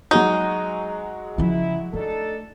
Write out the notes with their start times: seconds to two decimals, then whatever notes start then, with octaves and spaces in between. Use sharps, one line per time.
0.11 F#3 G#3 D#4 F#4
1.38 C#3 F3 E4
1.94 A3 D4 D#4 A4